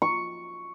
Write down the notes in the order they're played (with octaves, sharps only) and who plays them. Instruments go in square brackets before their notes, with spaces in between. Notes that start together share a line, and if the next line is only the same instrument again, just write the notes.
[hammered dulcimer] C#6